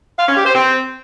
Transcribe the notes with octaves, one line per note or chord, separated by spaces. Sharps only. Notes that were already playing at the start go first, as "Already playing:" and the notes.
F5
C#4
G4
C5
C4